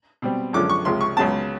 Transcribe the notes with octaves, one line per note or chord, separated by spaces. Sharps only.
B2 G3 C4
F#2 D3 F3 G#3 C#4 D6
C#6
C#2 C3 F3 G#3 C6
C#6
C#2 C#3 F#3 B3 A5